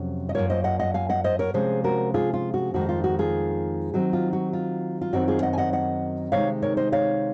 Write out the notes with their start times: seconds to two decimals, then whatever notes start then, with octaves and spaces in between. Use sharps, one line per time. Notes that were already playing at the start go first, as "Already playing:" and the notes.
Already playing: F2 C3 F#3 C#4
0.29 D#5
0.34 F#2 F3 A#3 F4 A#4 C#5
0.50 C5 D#5
0.64 D#5 F#5
0.79 D#5 F#5
0.94 F5 G#5
1.09 D#5 F#5
1.24 C5 D#5
1.39 A#4 C#5
1.54 C3 F3 G#3 C#4 G#4 C5
1.84 F#4 A#4
2.14 F4 G#4
2.34 F4
2.54 F#4
2.74 F2 D#3 G#3 F#4
2.89 F4
3.04 F#4
3.19 F4 G#4
3.93 D#3 F#3 C4 F#4
4.13 F4
4.33 F#4
4.53 F4
5.01 F4
5.13 F#2 D#3 F#3 C4 F#4
5.28 F4 G#4
5.42 D#5 F#5
5.53 G#5
5.58 D#5 F#5
5.73 D#5 F#5
6.32 C3 D#3 G#3 D#4 C#5 F5
6.62 A#4 C#5
6.77 C5 D#5
6.92 C#5 F5